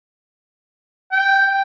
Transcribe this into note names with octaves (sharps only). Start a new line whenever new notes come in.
G5